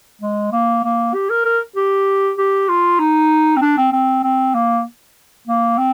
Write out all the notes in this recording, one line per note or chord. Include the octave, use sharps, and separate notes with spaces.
G#3
A#3
A#3
G4
A#4
A#4
G4
G4
F4
D#4
C4
D4
C4
C4
C4
A#3
A#3
C4